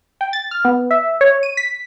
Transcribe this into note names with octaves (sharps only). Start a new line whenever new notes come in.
G5
A6
F6
B3
E5
C#5
D#7
B6